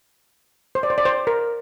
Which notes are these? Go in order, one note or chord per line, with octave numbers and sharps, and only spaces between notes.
C5
D5
C5
D5
C5
A#4